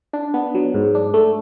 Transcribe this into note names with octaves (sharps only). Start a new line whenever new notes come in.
D4
B3
F#3
G#2
D4
A3